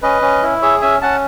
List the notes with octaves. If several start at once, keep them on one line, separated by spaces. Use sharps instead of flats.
C#4 B4 D#5
C#4
E4
G#4 C#5 E5
C#4 E5 G#5
C#4 F#5 A5